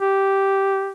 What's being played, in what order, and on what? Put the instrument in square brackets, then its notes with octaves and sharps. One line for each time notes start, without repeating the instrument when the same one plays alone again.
[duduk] G4